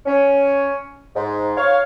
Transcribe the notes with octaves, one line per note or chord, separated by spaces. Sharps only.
C#4
G#2
C#5 F5